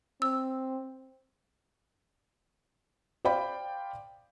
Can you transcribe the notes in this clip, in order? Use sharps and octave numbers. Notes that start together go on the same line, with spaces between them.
C4 E6
C5 D5 F5 G5 B5